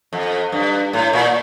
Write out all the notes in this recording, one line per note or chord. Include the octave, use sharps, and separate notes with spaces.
F2
G2
A2
A#2